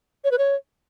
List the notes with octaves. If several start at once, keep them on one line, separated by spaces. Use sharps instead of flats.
C#5
B4
C#5